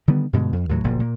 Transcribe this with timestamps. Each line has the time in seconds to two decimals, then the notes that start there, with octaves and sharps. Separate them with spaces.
0.08 D3 D#3 G3 B3
0.33 G2 B2 D3 G#3
0.53 F2
0.69 D#2 A2 F#3
0.84 F#1 D2 A#2 F3
1.00 A#2 A#3